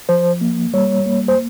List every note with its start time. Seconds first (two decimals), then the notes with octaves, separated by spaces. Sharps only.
0.09 F3 C5
0.41 A#3
0.74 G3 C#5
1.06 A#3
1.28 C5